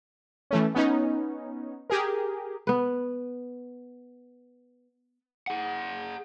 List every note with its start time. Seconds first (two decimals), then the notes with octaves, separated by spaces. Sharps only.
0.51 E3 A3 C#4
0.75 B3 C#4 D#4
1.90 G4 G#4 A#4
2.67 B3 B4
5.48 G#4 F#5